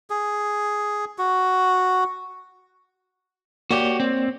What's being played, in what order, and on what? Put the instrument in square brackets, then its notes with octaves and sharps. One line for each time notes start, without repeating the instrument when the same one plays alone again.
[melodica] G#4
F#4
[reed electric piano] A#3 C#5 D5 [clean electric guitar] F#4 G4
[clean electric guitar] C4